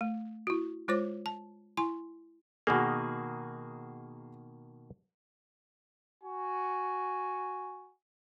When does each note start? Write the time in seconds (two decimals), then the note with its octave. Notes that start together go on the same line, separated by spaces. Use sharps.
0.01 A3
0.47 E4 F#4
0.88 G#3 F4 C5 C#5 D6
1.26 A5
1.77 E4 G#5 C6
2.67 B2 D#3 A#3 F#4 G#4
6.23 F#4 G#5